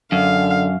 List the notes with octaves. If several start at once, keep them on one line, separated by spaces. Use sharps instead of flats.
F#2 D3 F5